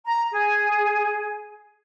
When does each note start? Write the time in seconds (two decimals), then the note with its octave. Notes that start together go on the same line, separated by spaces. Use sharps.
0.05 A#5
0.32 G#4